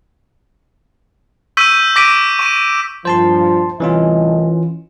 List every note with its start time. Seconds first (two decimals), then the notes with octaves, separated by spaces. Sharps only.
1.57 C#6 E6 G6 B6 D#7
1.96 D6 A#6 B6 D7 D#7
2.39 C#6 D#7
3.05 G2 A#2 F3 C5 A5 C6
3.80 C2 A2 E3 C#4 F4 D#5